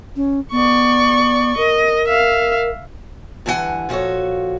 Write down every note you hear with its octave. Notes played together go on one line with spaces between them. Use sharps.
C#4
B3 D5 C#6
A#4 D#5
E5 F5
G2 D3 E3 D#4 F#5 G#5
A#2 F3 F#4 A4 C#5